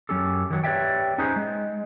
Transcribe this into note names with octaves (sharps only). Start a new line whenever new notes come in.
F#2 F#3 C#4 G4 A4
D#3 F#3
G4 B4 C#5 D5 E5 G5
C#4 D#4 G#4 B4 C5
G#3